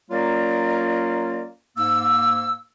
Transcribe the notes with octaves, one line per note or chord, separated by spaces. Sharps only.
F#3 A#3 C#4 F4 A#4 D5
G#2 A#3 E6